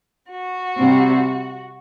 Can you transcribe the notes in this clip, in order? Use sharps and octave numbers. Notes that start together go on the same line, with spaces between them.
F#4
C3 G3 C4